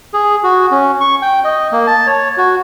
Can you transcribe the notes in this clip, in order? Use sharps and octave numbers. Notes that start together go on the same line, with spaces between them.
G#4
F#4
C#4
C#6
G5
D#5
A#3
A5
C#5
F#4